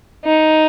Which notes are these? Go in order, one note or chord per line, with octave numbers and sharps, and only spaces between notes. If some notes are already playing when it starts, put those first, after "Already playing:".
D#4